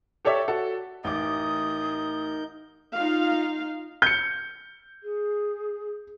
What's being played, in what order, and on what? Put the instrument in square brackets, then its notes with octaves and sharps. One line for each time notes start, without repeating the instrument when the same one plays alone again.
[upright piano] G4 A4 C#5 D5 E5
F#4 A4
[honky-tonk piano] A1 D6 [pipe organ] D#4 A#4 G6 [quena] D#6
[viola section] D#4 F4 F5
[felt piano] G6 C#7
[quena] G#4